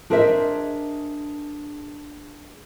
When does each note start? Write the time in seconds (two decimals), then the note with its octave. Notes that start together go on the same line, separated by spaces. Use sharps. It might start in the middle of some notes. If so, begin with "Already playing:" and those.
0.10 D4 G#4 A#4 C5 D#5 E5